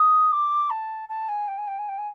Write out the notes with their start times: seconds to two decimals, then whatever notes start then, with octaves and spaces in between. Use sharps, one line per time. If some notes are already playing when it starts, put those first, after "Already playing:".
Already playing: D#6
0.32 D6
0.70 A5
1.09 A5
1.28 G#5
1.48 G5
1.58 G#5
1.67 G5
1.78 G#5
1.88 G5
1.98 G#5